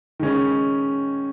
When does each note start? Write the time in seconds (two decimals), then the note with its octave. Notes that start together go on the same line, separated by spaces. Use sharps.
0.19 D#3 G#3 C#4